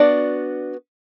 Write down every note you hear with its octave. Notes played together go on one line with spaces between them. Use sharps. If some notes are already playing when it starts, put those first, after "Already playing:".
Already playing: B3 D4 F#4 D5